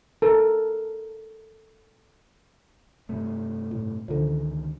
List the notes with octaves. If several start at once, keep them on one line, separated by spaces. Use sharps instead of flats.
A4 A#4
G2 C3 A3
A2
C#2 D3 D#3 F3